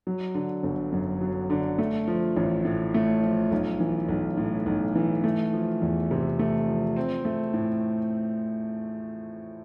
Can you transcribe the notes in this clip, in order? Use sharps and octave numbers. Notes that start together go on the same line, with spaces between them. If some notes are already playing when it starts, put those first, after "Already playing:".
F#3
D3
G1
F#2
F#3
D3
A3
F3
A1
A2
A3
F3
B1
E3
B1
A2
B1
E3
A3
F3
E2
C3
A3
F3
C4
A3
A2